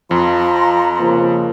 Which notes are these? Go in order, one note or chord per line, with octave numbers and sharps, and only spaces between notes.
F2 F3 A#5 C6
C#3 F3 A#3